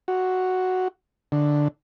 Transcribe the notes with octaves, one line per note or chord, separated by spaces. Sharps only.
F#4
D3